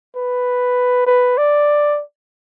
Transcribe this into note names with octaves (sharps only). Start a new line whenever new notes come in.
B4
B4
D5